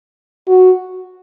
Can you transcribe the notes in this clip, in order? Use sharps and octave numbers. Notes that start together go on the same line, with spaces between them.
F#4